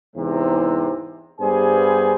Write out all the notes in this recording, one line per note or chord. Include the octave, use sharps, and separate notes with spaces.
E2 G#2 C3
G2 G3 B3 G#4 C5 G#5